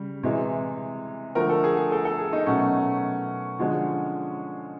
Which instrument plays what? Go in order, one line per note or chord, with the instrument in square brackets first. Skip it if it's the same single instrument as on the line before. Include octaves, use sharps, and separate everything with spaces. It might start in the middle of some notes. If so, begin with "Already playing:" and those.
Already playing: [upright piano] C#3 G3
C3 E3 G#3
D3 F3 A3 A#4
A4
G#4
G#4
A4
A4
G#4
D#4
B2 F#3 A3 C#4
D3 F3 G#3